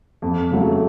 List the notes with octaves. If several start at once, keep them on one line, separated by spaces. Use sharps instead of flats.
F2
C#3 F#3 A3